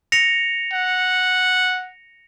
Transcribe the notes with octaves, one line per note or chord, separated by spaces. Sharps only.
A#6 C#7 F7
F#5